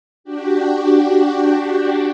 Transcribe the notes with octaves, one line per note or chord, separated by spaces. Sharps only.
D4 F#4 G4